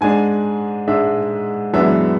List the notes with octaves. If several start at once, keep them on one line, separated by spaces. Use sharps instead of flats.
G#2 G#3 D4 G#5
G#2 G#3 D4 E5
F#2 E3 G#3 B3 D4 E5